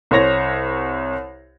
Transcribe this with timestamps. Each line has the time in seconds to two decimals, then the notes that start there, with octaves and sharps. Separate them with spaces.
0.11 C2 C5 C#5 A#6 F7